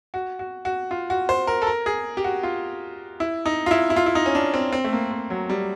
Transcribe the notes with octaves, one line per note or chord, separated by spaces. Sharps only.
F#4
F#4
F#4
F4
F#4
C5
A#4
A4
A#4
G#4
G4
F#4
F4
E4
D#4
F4
E4
E4
F4
E4
D#4
C#4
D4
C4
C4
A3
A#3
C4
F#3
G3